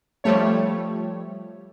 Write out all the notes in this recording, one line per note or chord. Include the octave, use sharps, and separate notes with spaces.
F3 G3 A3 C#5